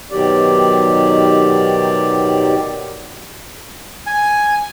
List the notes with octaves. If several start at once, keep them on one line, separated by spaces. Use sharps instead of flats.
B2 D#3 F#3 G4 D5
G#5